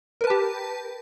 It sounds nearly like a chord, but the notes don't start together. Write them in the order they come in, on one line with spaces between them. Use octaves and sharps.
A#4 B4 A5 G4